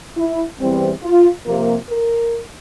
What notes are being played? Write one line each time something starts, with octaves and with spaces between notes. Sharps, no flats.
E4
E2 E3 G3 C4
F4
C3 F3 A#3
A#4